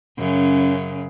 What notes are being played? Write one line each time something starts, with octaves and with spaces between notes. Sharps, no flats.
F#2 C#3